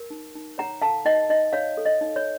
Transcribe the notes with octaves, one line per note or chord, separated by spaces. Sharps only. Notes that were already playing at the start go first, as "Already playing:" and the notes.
Already playing: A#4
D#4
D#4
C#5 F#5 A#5
A4 F5 A5
D#4 D#5 F#5
D#4 D#5
C#5 F5
A4
D#5
D#4
C#5